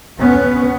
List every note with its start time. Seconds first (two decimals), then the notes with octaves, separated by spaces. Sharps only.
0.18 D2 C3 B3 C#4